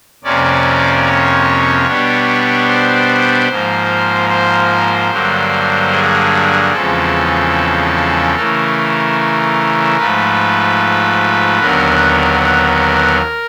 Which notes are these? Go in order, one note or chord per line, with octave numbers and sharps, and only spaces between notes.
F2 C3 F3 A#3 C#4 D5
C#5
B2 G3 B3 D4
C5
G#2 F3 A#3
C5
G2 D3 F#3 A#3
G#4
E2 C#3 F3 G#3 C4 A4
C#3 E3 A3 A#4
G#2 F3 A3 B4
D#2 D3 F#3 B3 A#4
A#4